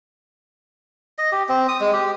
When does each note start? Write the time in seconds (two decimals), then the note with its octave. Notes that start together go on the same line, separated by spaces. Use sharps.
1.18 D#5
1.32 G4
1.49 C4
1.68 D#6
1.80 G#3
1.93 G4